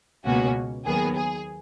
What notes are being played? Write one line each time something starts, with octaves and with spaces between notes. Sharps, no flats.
C#2 B2 A#3 C#4 F#4
D#2 D#3 F#3 B3 G#4
G#4